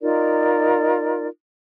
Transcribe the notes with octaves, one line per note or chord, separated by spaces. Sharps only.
D#4 F4 A#4 D5